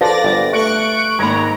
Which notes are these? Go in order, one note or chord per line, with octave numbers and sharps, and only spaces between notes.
F3 A4 B4 D5 A6 A#6
G1
A3 C#6 F#6 D7
G#1 A#3 A#5 B5 G#6